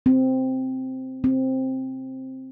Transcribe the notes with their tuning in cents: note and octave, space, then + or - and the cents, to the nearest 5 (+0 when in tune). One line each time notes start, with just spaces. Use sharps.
C4 -5
C4 +5